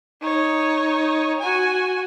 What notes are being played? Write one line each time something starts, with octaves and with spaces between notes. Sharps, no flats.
D#4 C#5
F#4 G#5